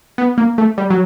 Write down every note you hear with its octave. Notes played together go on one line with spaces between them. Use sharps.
B3
A#3
A3
G3
F#3